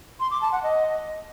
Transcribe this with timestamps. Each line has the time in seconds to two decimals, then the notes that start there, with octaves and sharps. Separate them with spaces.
0.20 C6
0.31 D6
0.41 A5
0.52 F#5
0.63 D#5